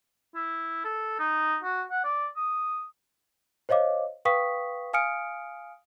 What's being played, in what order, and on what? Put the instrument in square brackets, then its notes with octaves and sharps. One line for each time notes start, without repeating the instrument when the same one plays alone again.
[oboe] E4
A4
D#4
F#4
F#5
D5
D#6
[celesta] C5 C#5 D#5 F5 D6
B4 F5 G5 C#6 D#6 B6
F5 G#5 D#6 F6 C#7 D7